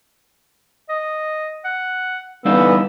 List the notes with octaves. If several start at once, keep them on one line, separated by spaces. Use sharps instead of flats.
D#5
F#5
D3 E3 G3 B3 D#4 F5 E6